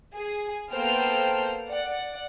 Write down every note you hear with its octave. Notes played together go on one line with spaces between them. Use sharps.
G#4
A#3 B3 A4 C5 G5 F6
D5 F#5